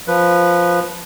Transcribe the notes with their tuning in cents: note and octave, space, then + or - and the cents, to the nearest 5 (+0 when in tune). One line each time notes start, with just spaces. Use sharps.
F3 +0 B4 +0